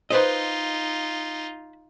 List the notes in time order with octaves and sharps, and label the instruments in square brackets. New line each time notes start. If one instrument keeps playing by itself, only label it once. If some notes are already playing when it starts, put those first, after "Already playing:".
[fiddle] D#4 F4 [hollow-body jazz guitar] B4 C5 D#5